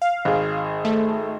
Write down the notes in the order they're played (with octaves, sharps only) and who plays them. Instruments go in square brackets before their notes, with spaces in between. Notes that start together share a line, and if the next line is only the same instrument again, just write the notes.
[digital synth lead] F5
[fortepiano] G#1 G#4
[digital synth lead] A3